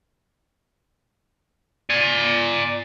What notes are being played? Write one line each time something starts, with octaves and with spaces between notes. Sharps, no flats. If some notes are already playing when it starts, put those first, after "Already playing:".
D5 G#5